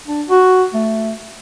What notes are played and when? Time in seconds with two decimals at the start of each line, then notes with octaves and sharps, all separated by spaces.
0.07 D4
0.29 F#4
0.74 A3